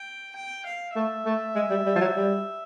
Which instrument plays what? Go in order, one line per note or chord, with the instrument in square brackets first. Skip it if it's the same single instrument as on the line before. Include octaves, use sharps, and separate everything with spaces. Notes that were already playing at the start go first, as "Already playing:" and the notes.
Already playing: [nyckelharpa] G5
G5
F5
[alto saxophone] A3 [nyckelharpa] E5
[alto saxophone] A3
G#3
G3
G3
F3
F#3
G3